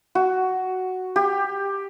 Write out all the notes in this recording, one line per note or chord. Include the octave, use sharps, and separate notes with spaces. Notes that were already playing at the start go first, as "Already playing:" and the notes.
F#4
G4